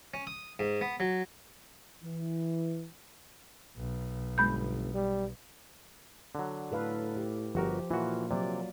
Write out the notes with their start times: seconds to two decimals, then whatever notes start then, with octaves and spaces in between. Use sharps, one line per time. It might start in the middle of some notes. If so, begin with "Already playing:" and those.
0.14 C#4
0.27 D#6
0.59 G#2
0.81 B3
1.00 F#3
2.04 E3
3.76 B1
4.38 G1 G#3 B5 G6
4.94 G3
6.35 D3 F#3
6.72 A2 A4 B4 F5
7.16 G4
7.55 G1 F3 F#4 G4 A#4
7.90 A#2 E3 F4 F#4 A#4
8.31 C3 F#3 A#3 D5